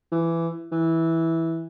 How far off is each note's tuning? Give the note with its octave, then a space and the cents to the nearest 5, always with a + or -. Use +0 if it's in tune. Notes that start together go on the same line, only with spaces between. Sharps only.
E3 +15
E3 -10